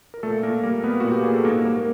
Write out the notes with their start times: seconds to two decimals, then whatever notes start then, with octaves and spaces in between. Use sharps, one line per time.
0.14 A#4
0.23 A#2 A3 A4
0.43 A#2 A#3 A#4
0.63 G3 A#3 A#4
0.84 G3 B3 B4
1.00 A#2 F#4
1.11 G4
1.23 A#2 G#4
1.34 A4
1.45 G#2 A#3 A#4
1.65 G3 A#3 A#4